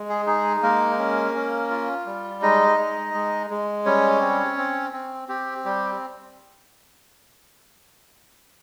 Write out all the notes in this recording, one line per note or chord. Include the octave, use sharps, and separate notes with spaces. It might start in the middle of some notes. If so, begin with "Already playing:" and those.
Already playing: G#3
G#4
D#4 G#4
G#3 A#3 A#4
C#4
C#4
F4
G3
G#3 D#4 D#5
G#3
G#3
G#3
G3 C#4 C#5
C4
C4
C4
C4 G4
G3 G4